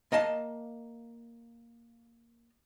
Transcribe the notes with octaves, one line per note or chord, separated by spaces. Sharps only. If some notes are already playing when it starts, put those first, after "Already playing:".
A#3 D#5 F5 A5